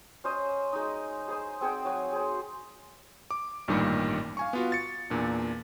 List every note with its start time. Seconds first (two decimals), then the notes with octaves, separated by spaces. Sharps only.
0.24 C#4 C5 D#5 C6
0.73 G#3 D#4
1.28 G#4 C5 C6
1.61 C4 G#4 F#5 G5
1.85 F#3 F#4 G#5
2.13 G#4 C5
3.31 D6
3.68 A1 G2 A#2 D#3 G3
4.37 F5 G#5 C#6
4.53 B3 F4 F#4
4.72 A6 C#7
5.10 E2 A#2 D4